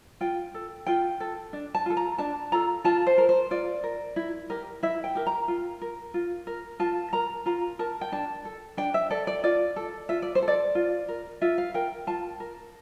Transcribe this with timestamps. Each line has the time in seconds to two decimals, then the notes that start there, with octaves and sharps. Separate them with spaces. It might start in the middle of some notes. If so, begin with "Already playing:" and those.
0.21 F4 G5
0.54 A4
0.86 F4 G5
1.20 A4
1.53 D4
1.75 A5
1.86 F4 A4
1.97 A#5
2.18 D4 A5
2.52 F4 A4 A#5
2.85 F4 A5
3.07 C5
3.18 A#4
3.29 C5
3.51 F4 D5
3.84 A#4
4.16 E4
4.50 G4 A#4
4.83 E4 E5
5.04 G5
5.15 G4 A#4
5.27 A#5
5.48 F4
5.82 A#4
6.14 F4
6.47 A#4
6.80 F4 A5
7.13 A#4 A#5
7.46 F4 A#5
7.79 A#4 A5
8.01 G5
8.12 D4 A5
8.45 A4
8.77 D4 G5
8.94 E5
9.10 A4 D5
9.27 D5
9.44 F4 D5
9.76 A4
10.09 F4 E5
10.22 D5
10.35 C5
10.43 A4
10.48 D5
10.75 F4
11.09 A#4
11.41 F4 E5
11.58 F5
11.74 A#4 G5
12.07 F4 A5
12.40 A#4